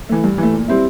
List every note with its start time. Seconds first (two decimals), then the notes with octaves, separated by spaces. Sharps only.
0.09 E3 A3
0.24 G2
0.38 E3 A3
0.53 A#2
0.68 G3 C4 E4